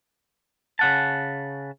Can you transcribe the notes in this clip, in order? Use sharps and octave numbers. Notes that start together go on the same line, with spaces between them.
C#3 F#5 A5